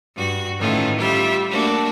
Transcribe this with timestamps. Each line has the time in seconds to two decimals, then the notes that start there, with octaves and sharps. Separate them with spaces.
0.16 G2 F#4
0.59 A2 D#3 E3 A3 C#4 F4
0.98 G3 F4 E5
1.49 A3 A#3 D4 F#4